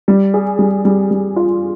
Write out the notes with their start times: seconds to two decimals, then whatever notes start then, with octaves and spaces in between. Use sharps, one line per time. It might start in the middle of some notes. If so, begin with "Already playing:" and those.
0.08 G3
0.34 G#4
0.59 G3
0.85 G3
1.11 G3
1.36 F4